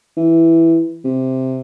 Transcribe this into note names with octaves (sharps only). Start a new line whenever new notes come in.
E3
C3